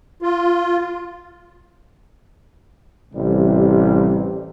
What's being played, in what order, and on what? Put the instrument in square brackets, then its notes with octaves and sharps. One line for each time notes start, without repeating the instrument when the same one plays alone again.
[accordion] F4
[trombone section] A1 C3 G3